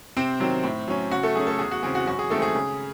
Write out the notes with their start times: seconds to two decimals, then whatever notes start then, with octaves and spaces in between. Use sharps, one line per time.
0.17 C3 C4 C5
0.40 D#3 F#3 C4
0.64 A2
0.88 F#3 C#4
1.11 C#3 F#4
1.23 A3 A4
1.35 F#3 C#4 G#4
1.47 A3 A4
1.59 E2 G#4
1.71 F#4
1.83 C#3 E3 C4 G#4
1.95 F#4
2.06 F#2 F#4
2.19 G#4
2.30 D#3 G#3 A3 C4 A4
2.42 G#4
2.55 C#3